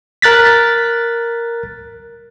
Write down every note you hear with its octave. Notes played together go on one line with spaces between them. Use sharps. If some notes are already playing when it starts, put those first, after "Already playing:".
A#4 F#6 A6 B6